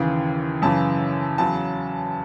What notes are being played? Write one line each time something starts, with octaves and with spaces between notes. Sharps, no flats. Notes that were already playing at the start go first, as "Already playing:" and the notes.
Already playing: D#2 C#3 E3
F#2 C#3 E3 A5
E2 C#3 F#3 A5